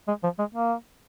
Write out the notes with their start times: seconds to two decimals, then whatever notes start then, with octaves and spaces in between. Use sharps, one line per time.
0.08 G#3
0.23 F3
0.39 G#3
0.55 A#3